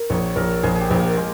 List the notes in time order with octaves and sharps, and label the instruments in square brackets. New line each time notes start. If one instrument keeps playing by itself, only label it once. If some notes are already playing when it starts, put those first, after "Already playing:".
Already playing: [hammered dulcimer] A#4
[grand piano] A#1 [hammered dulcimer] C#5
[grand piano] A#1 [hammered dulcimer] A#4
[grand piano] A#1 [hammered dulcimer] G#4
[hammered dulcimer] G#4
G4
[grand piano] A#1
[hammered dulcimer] A#3
G#3